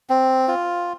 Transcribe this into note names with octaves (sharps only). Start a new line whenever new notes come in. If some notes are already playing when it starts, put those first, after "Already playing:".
C4
F4